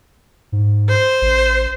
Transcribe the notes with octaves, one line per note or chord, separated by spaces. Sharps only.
G#2
C5
A1